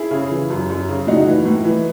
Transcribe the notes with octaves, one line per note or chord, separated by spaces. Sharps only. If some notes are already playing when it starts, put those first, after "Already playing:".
Already playing: E4 G#4
C#3
E3
F#2
F#2
C#3
A2 D#4 F#4
E3
A2
E3